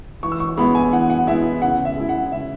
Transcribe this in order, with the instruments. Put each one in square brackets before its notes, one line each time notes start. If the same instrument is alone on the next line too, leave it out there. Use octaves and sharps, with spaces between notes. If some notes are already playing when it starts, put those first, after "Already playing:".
[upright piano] E3 C#6
E6
C#6
G#3 B3 E4 B5
G#5
E3 F#5
F#5
G#3 B3 E4 E5
C#3 F#5
E5
G#3 E4
F#5
C#3 E5